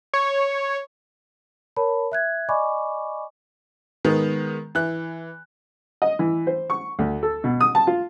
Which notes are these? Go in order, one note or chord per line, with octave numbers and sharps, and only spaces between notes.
C#5
A#4 C#5 A5 B5
E5 F#6 G#6
D5 D#5 G#5 B5 C#6 D6
D#3 G#3 B3
E3 F#6
D#5
E3
C5
C#6
D2
A4
B2
D#6
A5
F4